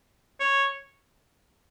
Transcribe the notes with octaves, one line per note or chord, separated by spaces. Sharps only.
C#5